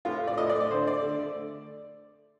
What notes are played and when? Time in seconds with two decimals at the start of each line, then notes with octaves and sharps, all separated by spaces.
0.05 A2 F4
0.22 A3
0.27 D5
0.38 A2 D#5
0.49 D5
0.55 A3
0.60 D5
0.70 D3 C5
0.87 A3 D5
1.02 D3
1.20 A3